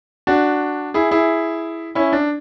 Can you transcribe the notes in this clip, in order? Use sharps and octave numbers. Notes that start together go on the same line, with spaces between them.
D4 F#4
E4 G#4
E4 G#4
C#4 E4
D4